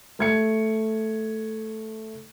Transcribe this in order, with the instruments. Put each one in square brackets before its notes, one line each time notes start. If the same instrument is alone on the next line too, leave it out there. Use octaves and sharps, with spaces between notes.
[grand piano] A3 G#6 C#7